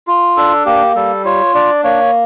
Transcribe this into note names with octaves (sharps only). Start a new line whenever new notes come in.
F4
D4 A4
A#3 G4
G3 A4
F4 C#5
D4 D5
A#3 C#5